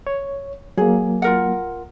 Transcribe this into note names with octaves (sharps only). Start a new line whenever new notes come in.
C#5
F#3 A#3 G#4
F4 A#4 F#5